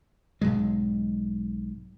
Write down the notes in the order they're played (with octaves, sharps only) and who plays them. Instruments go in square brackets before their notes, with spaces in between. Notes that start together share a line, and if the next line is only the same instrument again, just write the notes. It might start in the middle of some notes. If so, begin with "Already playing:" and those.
[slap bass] B1 G#2 F#3 G#3